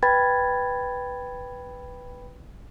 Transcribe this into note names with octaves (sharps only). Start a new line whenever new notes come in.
B4 G5 B5 G#6 A6